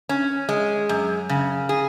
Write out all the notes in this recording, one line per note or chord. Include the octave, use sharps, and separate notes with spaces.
C#4
G#3
F#2
C#3
G#4